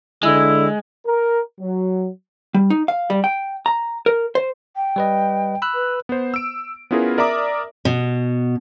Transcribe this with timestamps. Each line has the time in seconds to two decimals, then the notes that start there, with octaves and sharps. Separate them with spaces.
0.23 D3 G#3 E4
1.07 A#4
1.61 F#3
2.54 G3
2.70 D#4
2.88 F5
3.10 G3
3.24 G5
3.66 A#5
4.06 A#4
4.35 C5
4.76 G5
4.96 G3 B4 D#5
5.62 B5 E6 F#6
5.74 B4
6.09 B3 C5
6.34 E6 D7
6.91 B3 C#4 E4 F4 G#4 A#4
7.18 A#4 D5 E5 A#5 D6 D#6
7.85 B2